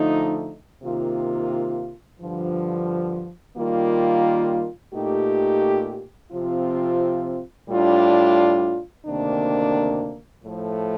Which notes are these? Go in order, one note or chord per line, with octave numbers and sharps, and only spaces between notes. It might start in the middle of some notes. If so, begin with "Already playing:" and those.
Already playing: D3 F3 A3 D#4
C3 D#3 A#3 F4
G2 D3 F3
D#3 G3 A#3 F4
A#2 A3 D#4 G4
C3 F3 C4 F4
A2 G3 D4 F4
D2 C3 D#3 A#3 D4
A2 F3 A3